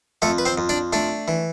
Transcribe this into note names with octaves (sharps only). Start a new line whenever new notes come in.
F2 A3 A4
B4
C4 C5
F2
D4 D5
A3 D4 D5
E3